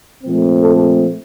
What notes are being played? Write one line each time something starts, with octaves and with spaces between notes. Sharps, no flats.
A#2 F3 A3 C4
A4